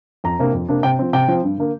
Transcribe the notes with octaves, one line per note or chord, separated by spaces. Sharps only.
F2 A#5
C3 A#3 D4
F2
C3 A#3 D4
C3 G5
F3 C4
C3 G5
F3 C4
G2
D3 A#3